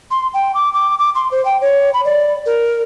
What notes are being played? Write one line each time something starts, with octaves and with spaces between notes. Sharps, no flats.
C6
G5
D6
D6
D6
C6
C5
G5
C#5
B5
D5
A#4